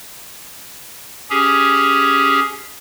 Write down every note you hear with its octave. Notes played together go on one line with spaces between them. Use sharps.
C#4 G4 G#4